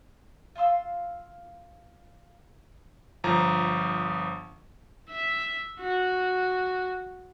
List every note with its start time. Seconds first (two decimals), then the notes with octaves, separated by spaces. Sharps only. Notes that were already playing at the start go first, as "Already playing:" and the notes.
0.55 F4 F5 C6 E6
3.24 G1 F3 A#5
5.10 E5
5.80 F#4